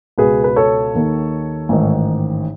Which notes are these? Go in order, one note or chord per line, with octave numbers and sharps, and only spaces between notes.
C#2 B2 G#4 B4
B4
A4 C#5
D#2 D#3
A1 G#2 D#3